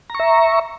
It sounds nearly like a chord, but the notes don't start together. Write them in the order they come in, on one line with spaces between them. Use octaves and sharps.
A#5 C#6 E5